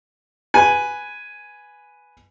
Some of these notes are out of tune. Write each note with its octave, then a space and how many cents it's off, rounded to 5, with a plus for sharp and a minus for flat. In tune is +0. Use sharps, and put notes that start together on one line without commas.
B4 +0 G#5 +0